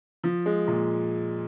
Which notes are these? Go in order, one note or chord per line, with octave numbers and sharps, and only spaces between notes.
F3
G#3
A#2